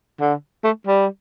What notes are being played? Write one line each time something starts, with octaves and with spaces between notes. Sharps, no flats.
D3
A3
G3